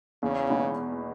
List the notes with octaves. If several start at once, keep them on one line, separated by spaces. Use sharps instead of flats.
E2 C#3
B2 G#3 B3 D#4